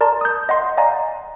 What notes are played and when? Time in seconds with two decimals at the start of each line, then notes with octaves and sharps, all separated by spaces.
0.01 A#4 D5 A5 A#5 C6
0.21 D#6 G6
0.49 D#5 F#5 C6
0.77 D5 D#5 F5 F#5 G#5 A#5